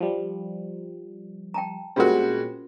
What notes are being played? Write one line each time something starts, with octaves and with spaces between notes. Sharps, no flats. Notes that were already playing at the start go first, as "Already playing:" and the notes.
F3 G3
G5 A5 A#5
A#2 G3 G#3 C4 C#4 F4 F#4 A#4